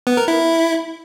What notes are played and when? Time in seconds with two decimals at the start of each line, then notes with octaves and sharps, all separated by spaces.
0.07 B3
0.17 A#4
0.28 E4